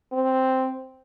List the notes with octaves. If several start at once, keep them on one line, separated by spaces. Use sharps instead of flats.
C4